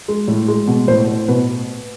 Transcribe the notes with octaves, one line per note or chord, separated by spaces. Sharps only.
G#3
A2
G#3
B2
A2 C5
A2
B2 B4